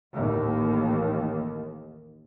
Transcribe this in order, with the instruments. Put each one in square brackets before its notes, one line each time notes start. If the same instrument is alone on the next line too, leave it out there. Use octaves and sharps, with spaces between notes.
[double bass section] A1 D#2